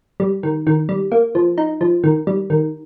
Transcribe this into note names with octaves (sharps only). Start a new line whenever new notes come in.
G3
D#3
D#3
G3
A#3
F3
D#4
F3
D#3
G3
D#3